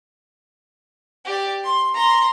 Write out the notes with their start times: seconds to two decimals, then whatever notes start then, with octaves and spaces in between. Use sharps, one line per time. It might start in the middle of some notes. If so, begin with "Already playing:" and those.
1.25 G4 D5
1.64 C6
1.94 A#5 C6